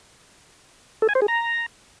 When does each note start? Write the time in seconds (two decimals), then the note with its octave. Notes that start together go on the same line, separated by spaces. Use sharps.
1.02 A4
1.09 G#5
1.15 C5
1.22 G#4
1.28 A#5